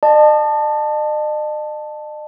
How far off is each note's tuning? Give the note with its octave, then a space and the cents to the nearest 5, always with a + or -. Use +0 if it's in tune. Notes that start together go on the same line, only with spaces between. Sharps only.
D#5 -45 A5 +0